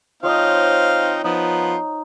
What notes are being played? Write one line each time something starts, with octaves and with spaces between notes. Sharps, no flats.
F3 C4 D#4 C#5 D#5 F5
F3 B3 D#4